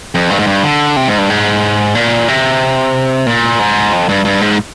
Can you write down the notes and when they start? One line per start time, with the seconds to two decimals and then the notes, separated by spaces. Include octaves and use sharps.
0.15 F2
0.30 G2
0.39 G#2
0.47 G2
0.64 D3
0.97 C3
1.08 G#2
1.18 G2
1.30 G#2
1.95 A#2
2.28 C3
3.26 A#2
3.59 G#2
3.93 F2
4.09 G2
4.25 G2
4.41 G#2